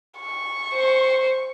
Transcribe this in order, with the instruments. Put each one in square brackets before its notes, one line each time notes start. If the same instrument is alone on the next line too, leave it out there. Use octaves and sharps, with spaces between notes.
[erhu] C#6
[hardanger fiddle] C5